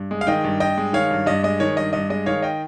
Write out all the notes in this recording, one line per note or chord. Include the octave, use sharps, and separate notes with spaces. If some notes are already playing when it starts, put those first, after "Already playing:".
Already playing: G2
G#3
F5
D#3 D#5 G5
G2
G2 D#5 G5
G#3
D#3 C#5 F5
G2
G2 D#5
G#3 D#5
D#3 C#5
G2 D#5
G2 D#5
G#3 D#5
D#3 C#5 F5
D#5 G5